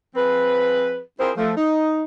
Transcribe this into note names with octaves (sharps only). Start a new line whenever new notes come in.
F3 C4 G#4 B4
C4 E4 F4 G#4 A#4 C5
F3 A3
D#4